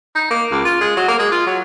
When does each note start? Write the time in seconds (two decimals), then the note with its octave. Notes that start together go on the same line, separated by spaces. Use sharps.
0.15 D#4
0.30 A#3
0.51 C#2
0.65 F4
0.81 G#3
0.96 F#3
1.08 A#3
1.19 G#3
1.32 F4
1.46 F#3